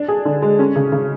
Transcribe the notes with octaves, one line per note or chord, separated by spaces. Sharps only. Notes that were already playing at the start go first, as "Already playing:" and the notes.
Already playing: D4
G#4
D3
G#3
C#4
C#3
C#3